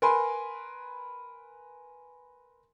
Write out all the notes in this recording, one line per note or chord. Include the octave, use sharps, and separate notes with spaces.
A#4 B4 G#5 C6